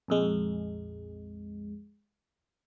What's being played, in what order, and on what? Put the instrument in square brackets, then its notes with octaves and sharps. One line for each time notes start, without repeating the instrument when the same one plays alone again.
[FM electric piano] A#1 F2 G#3